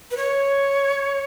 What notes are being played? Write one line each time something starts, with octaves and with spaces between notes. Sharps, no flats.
B4
C#5